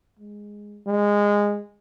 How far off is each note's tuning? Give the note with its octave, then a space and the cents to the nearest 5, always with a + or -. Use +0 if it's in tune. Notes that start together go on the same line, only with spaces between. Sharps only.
G#3 -5
G#3 -15